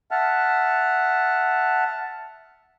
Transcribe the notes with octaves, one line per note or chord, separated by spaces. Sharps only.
E5 F#5 A5 F6